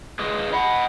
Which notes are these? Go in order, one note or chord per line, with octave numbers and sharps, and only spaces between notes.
G#4 B4 D#5
D#5 F#5 B5